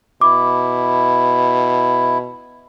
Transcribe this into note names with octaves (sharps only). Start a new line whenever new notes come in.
B2 E4 D6